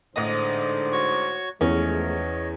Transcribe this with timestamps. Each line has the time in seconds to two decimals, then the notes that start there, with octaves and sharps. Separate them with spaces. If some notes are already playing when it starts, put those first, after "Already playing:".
0.16 A1 G#2 D3 C5 D#5
0.92 F#4 C#5 C#6
1.61 E2 F3 G#3 A3 C#4 C#5 D#5